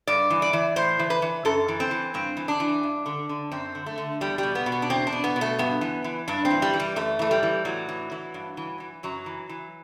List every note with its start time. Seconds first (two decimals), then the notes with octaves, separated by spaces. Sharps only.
0.07 G2 D5
0.30 E3
0.42 D5
0.53 E3
0.76 A2 C5
0.99 E3
1.10 B4
1.22 E3
1.45 F#2 A4
1.68 E3
1.80 C4
1.91 E3
2.14 G2 C4
2.37 E3
2.48 D4
2.60 E3
2.83 G2
3.06 D3
3.29 D3
3.51 F#2 C4
3.75 D3
3.86 A3
3.98 D3
4.21 E2 G3
4.38 B2 G3
4.55 B3
4.66 B2
4.72 B3
4.82 D4
4.90 E2 C4
5.07 D4
5.13 B2
5.24 B3
5.36 B2
5.41 A3
5.59 G2 B3
5.81 E3
6.04 E3
6.28 G2 D4
6.45 C4
6.51 E3
6.62 G3
6.74 E3
6.80 G3
6.96 F#2 A3
7.19 E3 A3
7.31 G3
7.43 E3
7.65 A2 F#3
7.89 E3
8.11 E3
8.34 G2
8.57 E3
8.80 E3
9.03 F#2 F#3
9.26 E3
9.49 E3